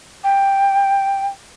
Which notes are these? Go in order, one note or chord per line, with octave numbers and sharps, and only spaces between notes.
G5